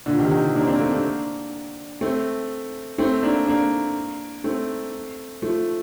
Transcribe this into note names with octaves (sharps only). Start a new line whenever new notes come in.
A#2 D3
C3 D#3
C3 D#3
A#3 D4
C4
A#3 D4
A3 C4
A#3 D4
A3 C4
A3 C4
A#3 D4
A#3 D4
A3 C4
F3 A3